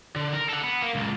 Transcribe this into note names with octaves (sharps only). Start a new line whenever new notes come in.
D3
A#4
A4 F#5
B3
A#3
C#2 A#2